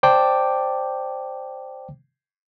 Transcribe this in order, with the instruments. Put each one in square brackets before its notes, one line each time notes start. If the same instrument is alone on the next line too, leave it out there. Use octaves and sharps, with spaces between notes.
[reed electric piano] C5 D5 G5 A5 D6